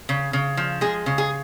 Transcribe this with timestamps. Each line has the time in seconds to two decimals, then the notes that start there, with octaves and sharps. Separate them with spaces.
0.09 C#3
0.33 C#3
0.57 F3
0.81 G#3 G#4
1.06 C#3
1.18 G#4